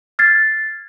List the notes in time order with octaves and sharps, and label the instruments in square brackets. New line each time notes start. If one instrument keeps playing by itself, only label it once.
[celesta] F6 G#6 A6 C7